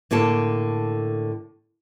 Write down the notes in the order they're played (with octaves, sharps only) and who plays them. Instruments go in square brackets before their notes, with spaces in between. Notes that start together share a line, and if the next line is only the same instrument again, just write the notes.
[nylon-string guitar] A2 D3 A#3 A4